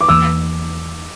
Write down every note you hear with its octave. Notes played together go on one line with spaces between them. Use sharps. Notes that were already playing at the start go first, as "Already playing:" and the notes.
D6
E2 E3 A#3 E6